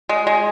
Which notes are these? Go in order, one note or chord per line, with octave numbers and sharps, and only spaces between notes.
G#3
G#3